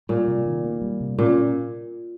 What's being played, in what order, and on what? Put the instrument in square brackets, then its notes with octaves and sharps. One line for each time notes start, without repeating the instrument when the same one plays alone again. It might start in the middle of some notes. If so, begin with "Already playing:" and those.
[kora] A#2 [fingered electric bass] G3
[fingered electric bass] C3
D#3
A#3
G3
C3
[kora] A#2 [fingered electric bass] C#4